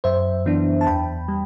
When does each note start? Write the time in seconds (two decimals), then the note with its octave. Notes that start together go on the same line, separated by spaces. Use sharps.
0.04 F#2 C5 E5
0.46 E3 B3 D4
0.81 A5
0.87 E2 G5 B5
1.28 G3